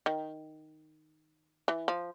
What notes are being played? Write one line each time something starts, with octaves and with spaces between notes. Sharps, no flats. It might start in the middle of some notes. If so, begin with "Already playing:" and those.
D#3
E3
F3